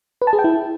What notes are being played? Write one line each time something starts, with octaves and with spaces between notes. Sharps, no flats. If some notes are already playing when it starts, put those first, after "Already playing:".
B4
A5
G#4
G5
E4